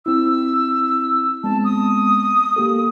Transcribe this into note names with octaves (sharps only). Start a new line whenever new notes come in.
C4 E4 E6
G#3 B3 C4 A5
D#6
A#3 G4 A4